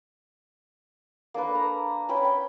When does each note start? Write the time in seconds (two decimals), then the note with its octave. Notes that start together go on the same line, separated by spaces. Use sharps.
1.34 A#3 D4 A4 B4
1.55 A#5
2.09 C#4 B4 G5 B5
2.25 G5